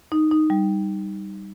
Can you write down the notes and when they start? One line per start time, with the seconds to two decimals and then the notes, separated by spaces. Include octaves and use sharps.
0.12 D#4
0.31 D#4
0.50 G3